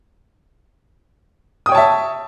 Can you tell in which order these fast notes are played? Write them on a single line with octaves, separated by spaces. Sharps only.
D#6 G5 C#5 A5 E5